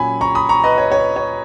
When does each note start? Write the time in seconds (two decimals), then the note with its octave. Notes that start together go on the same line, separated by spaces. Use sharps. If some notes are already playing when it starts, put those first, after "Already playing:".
Already playing: A#2 F#3 C#4 G#5 B5
0.21 A#5 C#6
0.35 B5 D#6
0.49 A#5 C#6
0.64 B4 D#5
0.78 C#5
0.92 C#5
0.97 B4
1.16 C#5